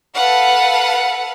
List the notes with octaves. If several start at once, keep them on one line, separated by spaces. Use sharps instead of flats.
A4 B4 F5 F#5